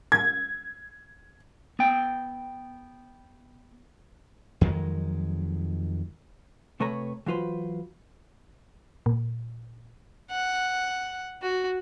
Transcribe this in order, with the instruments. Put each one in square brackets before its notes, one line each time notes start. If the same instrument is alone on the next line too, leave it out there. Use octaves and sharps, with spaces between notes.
[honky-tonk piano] G#6
[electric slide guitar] B3 G5
[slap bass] F2 D#3 F#3 G#3
[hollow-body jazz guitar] C3 A3 A4 B4 C#5 A#5
E3 F#3 F4 B4 C5
[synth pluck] A#2
[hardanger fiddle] F#5
F#4